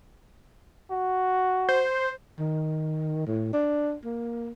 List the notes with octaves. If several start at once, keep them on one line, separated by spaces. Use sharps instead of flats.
F#4
C5
D#3
A2
D4
A#3